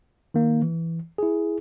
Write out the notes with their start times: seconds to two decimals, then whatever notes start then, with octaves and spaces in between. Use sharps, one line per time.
0.34 D#3 A#3
0.62 E3
1.18 E4 G#4